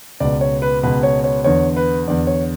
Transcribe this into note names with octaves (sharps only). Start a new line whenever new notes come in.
C#2 B2 D5
C#5
B4
C#2 B2 B4
C#5
C#5
E2 D3 C#5
B4
E2 D3 D5
C#5